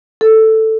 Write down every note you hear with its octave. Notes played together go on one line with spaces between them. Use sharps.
A4